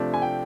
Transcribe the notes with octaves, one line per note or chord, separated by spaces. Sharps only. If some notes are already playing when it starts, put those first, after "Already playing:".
Already playing: C3 F3 A3 D4
G#5
G5